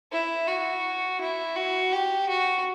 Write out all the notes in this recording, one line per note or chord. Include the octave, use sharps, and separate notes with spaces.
E4
F#4
E4
F#4
G4
F#4